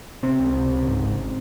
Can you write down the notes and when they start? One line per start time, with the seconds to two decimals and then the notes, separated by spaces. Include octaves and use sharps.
0.23 C3 C4
0.39 C#2
0.55 C3
0.71 C#2
0.87 G#2
1.02 G#1